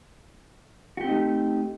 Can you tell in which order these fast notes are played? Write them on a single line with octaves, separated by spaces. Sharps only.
F#4 G4 C4 D#4 A3